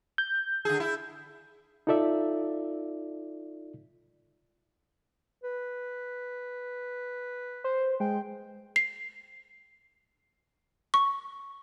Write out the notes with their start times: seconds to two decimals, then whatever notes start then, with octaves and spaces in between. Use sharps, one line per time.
0.18 G6
0.65 D3 G#4
0.80 E4
1.87 D#4 F4 A4 D5 E5
5.44 B4
7.64 C5
8.00 G#3 G5
8.76 C7
10.94 C#6